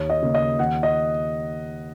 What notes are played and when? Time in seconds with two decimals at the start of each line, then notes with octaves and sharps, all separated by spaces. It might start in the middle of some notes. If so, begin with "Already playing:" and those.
Already playing: D#2 C#5
0.10 D#5
0.22 C#3 A#3
0.35 D#5
0.59 D#2 F#5
0.83 D#5